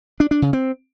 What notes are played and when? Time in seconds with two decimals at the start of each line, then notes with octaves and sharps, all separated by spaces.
0.20 D4
0.31 D4
0.42 C#3
0.53 C4